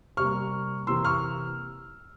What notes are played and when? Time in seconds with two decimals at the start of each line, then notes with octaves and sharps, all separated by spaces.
0.17 C3 G3 A#3 C#6 F6
0.87 C3 E3 A#3 C6 E6
1.05 C#6 F6